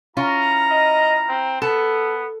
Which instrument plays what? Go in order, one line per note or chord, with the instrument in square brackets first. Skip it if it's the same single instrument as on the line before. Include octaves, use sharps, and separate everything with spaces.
[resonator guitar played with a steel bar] C#4 F4 [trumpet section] E4 A#5
[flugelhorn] D#5
C4
[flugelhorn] B3 [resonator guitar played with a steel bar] A4